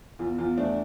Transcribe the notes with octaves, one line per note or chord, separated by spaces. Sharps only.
E2 F4
E2 F4
A3 D4